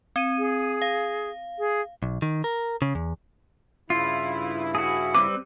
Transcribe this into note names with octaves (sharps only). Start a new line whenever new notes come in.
C4 D#7
G#4
F5
G#4
B1
D#3
A#4
C#3
E2
G2 C#3 E4 F4
F#4 G#4
G3 C4 B4 D6